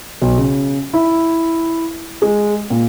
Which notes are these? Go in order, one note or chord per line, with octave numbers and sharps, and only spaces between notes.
B1
C#3
E4
G#3
A#2